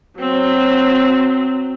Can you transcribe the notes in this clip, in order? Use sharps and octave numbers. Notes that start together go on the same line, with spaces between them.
F#3 C4